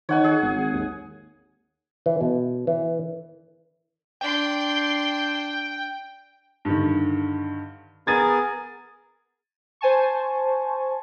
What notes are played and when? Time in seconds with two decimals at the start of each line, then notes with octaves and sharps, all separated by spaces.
0.09 D#3 C#5 F#5 G#5
0.24 G#4
0.42 G#1
0.73 D#2
2.06 E3
2.21 B2
2.67 E3
4.21 D4 G5 C6
6.65 G2 D3 D#3
8.07 B3 G#4 A#4 G#6 A6 D#7
9.81 C5 G#5 A5 C#6